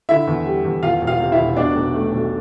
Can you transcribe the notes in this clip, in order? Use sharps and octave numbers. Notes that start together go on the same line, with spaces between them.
D3 E4 E5
E2
G3
E2
E2 F4 F5
E1
F4 F5
C3
E4 E5
E1
B2 D4 D5
B1
A3
B1